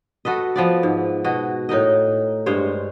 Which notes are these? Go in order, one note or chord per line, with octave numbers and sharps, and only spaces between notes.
F#4 A4 B4 D#5
F3 B3 D5
G#2
B2 F#4 D#5
A2 D#4 A#4 D#5
G2 G#3 C5 C#5